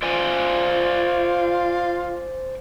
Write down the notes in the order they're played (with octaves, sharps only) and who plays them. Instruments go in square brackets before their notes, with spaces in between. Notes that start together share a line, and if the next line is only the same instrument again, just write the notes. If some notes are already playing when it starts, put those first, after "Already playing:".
[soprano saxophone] F4 [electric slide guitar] C5 D5 G#5